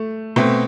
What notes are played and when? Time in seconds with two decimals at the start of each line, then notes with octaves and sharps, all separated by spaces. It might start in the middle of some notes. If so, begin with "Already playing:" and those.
Already playing: A3
0.36 B2 A3 C4